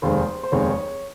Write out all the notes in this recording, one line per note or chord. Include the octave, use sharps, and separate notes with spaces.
F1 D#2 D#3 G#3 C4 C5
C5
F1 D#2 D#3 G#3 C4 C#5